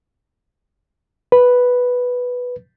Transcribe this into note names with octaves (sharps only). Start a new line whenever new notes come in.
B4